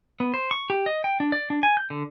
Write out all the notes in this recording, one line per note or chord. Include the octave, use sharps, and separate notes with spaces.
B3
C5
C#6
G4
D#5
G5
D4
D5
D4
G#5
G6
D3